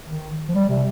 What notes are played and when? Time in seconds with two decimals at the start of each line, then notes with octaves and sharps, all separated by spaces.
0.09 D#3
0.48 F3
0.54 G3
0.69 C3